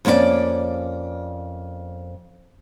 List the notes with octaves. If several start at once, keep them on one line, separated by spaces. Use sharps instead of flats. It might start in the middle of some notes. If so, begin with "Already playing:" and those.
F2 A#3 C#4 E4 D5